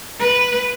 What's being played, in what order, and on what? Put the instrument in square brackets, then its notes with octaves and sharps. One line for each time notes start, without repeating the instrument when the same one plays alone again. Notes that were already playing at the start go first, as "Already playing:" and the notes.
[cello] B4